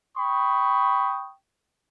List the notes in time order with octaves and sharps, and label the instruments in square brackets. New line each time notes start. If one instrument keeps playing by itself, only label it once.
[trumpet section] G5 B5 C#6 D#6